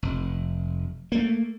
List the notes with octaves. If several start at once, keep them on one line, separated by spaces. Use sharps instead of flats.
F1
A3 A#3